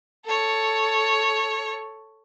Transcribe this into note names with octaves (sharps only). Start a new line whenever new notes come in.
A4 C#5